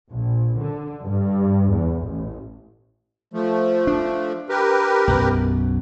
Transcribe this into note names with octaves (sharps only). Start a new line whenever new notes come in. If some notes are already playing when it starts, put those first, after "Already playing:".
A#1
D3
G2
E2
A1
F3 A3
D4
G4 A#4 B4
B1 F#2 B2